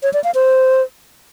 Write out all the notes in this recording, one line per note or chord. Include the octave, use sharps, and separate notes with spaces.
C#5
D5
F5
C5